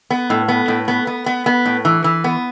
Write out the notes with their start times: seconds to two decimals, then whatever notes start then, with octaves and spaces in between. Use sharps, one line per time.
0.10 B3
0.30 A2
0.48 B3
0.68 A2
0.88 B3
1.07 B3
1.26 B3
1.46 B3
1.66 A2
1.85 E3
2.04 E3
2.24 B3